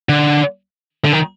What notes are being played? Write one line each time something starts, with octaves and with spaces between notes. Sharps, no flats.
D3
D3
D#3